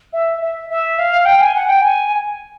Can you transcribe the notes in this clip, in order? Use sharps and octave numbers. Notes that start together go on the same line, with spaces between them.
E5
E5
E5
F5
G5
G#5
F#5
G5
G#5